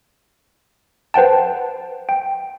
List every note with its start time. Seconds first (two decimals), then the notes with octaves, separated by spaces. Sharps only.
1.14 B4 C5 F#5 G5 A5
2.09 G5